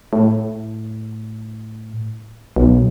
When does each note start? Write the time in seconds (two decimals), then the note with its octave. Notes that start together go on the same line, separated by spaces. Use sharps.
0.13 A2
2.56 B1